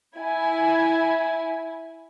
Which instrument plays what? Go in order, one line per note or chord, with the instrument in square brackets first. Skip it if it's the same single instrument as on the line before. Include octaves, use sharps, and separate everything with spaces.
[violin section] E4 G#5